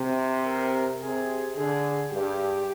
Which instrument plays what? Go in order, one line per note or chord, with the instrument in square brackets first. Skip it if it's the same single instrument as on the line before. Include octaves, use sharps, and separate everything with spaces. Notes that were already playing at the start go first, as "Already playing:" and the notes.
Already playing: [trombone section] C3
[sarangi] A#4
[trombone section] C3 [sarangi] G#4
[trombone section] D3 [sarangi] G#4
[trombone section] G2 [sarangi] G4